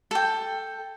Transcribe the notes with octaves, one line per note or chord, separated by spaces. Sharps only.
A4 G5